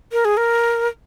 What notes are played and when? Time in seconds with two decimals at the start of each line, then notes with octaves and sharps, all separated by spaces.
0.12 A#4
0.25 G#4
0.37 A#4